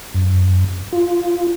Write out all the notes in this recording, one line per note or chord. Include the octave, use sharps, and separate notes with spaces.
F#2
F4